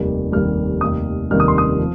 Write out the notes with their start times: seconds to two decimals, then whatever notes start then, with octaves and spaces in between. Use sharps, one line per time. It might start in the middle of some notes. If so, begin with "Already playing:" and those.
Already playing: F1 D#2 D#3 G3
0.32 F1 D#2 D#3 G3 F6
0.81 F1 D#2 D#3 G3 D#6
1.31 F1 D#2 D#3 G3 F6
1.40 D#6
1.48 C6
1.58 D#6
1.79 F3